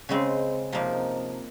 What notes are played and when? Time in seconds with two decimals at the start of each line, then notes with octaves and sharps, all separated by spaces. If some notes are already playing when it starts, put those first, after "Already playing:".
0.09 C#3 G#3 C4
0.72 C3 F3 A#3 D#4